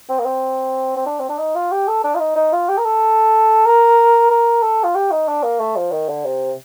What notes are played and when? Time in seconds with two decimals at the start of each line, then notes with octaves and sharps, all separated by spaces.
0.09 C4
0.20 A#3
0.26 C4
0.97 C4
1.06 D4
1.19 C4
1.29 D4
1.39 D#4
1.55 F4
1.72 G4
1.88 A4
2.04 D4
2.15 F4
2.20 D#4
2.36 D#4
2.53 F4
2.69 G4
2.78 A#4
2.85 A4
3.66 A#4
4.30 A#4
4.62 A4
4.84 F4
4.95 G4
5.11 D#4
5.28 D4
5.43 A#3
5.60 A3
5.76 F3
5.92 D#3
6.09 D3
6.25 C3